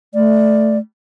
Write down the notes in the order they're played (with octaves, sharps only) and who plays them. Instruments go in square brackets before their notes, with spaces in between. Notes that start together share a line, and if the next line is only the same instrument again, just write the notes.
[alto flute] A3 [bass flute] D5